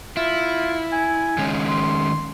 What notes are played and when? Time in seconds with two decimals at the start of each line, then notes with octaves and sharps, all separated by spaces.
0.17 E4 F4
0.92 G#5
1.38 D#3 G#3 C#4
1.69 C6